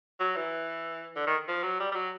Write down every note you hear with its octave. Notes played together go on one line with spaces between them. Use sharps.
F#3
E3
D3
D#3
F3
F#3
G3
G3
F#3